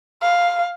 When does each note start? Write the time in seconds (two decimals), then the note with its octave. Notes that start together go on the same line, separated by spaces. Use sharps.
0.22 F5